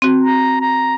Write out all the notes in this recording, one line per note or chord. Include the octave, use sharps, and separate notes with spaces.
C4 F#4
A#5
A#5